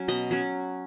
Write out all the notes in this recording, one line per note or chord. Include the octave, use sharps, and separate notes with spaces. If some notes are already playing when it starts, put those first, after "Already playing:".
Already playing: F#3 C#4
B2 D#5
F#3 C#4